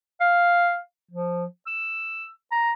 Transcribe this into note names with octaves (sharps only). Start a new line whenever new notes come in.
F5
F3
E6
A#5